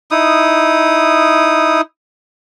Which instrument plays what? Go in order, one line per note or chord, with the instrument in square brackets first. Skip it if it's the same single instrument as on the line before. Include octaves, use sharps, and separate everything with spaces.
[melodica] D#4 E4 D#6